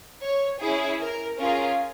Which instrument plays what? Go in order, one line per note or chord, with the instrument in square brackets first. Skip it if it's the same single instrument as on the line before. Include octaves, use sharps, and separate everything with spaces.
[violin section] C#5
C#4 E4 G#4
A#4
C#4 F4 G#4 A#4